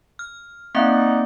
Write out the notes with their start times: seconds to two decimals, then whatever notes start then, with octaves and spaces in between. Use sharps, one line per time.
0.19 F6
0.75 A#3 C4 D#4 D5 E5 F#5